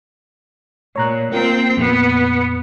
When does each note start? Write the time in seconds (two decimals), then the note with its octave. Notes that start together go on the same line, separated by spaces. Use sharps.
0.96 A#2 C#5 A#5 F#6
1.32 A#3 C4 F4 A#4 G5
1.77 F2 A#2 B3